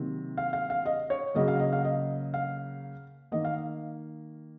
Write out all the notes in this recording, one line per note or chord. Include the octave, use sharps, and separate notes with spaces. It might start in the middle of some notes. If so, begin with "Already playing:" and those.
Already playing: C3 D#3 F#3 A#3
F5
F5
F5
D#5
C#5
C#3 F#3 A#3 D#5
F5
D#5
F5
D#5
F5
D#3 A#3 D#5
F5